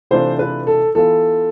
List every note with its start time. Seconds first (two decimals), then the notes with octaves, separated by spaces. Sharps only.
0.11 C3 E3 A3 D4 F4 C5
0.39 B4
0.67 A4
0.95 E3 B3 F4 A4